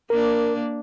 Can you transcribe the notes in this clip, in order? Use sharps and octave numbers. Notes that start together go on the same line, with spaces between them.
A#3 D4 A#4